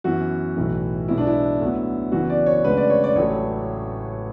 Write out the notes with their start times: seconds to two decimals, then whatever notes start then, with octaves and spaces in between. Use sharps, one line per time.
0.04 F#2 E3 B3 F#4
0.56 B1 A2 E3
1.08 B1 B2 G#3 B3 E4
1.18 D4
1.27 E4
1.60 D2 D3 F#3 B3
2.12 F#1 F#2 E3 B3 F#4
2.30 D5
2.46 C#5
2.64 D2 C#3 G#3 B4
2.77 D5
2.90 C#5
3.04 D5
3.16 A1 A2 F#3 A3 C#5